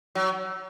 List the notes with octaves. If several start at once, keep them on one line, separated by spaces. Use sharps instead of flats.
F#3